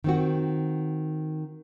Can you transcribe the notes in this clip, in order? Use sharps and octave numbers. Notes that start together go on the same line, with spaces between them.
D#3 C4 F#4